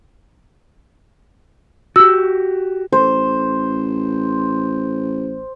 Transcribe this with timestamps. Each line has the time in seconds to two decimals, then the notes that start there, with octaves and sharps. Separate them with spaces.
1.96 F#4 G4 E6
2.92 A1 C5